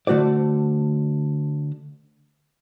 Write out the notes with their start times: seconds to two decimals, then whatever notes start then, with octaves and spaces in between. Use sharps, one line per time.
0.07 D3 A3 F#4 C5 D5